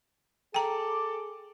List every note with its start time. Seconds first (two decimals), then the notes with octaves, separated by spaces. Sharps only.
0.54 G#4 A4 G5 A#5 D6